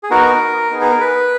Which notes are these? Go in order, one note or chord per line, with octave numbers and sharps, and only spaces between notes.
G#4
B3 D#4 F#4 A#4
B3 D#4 G#4
G#4
A#4
B4